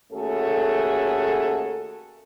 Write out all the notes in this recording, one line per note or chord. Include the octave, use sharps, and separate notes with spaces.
D#2 A3 C#4 F#4 G#4 A4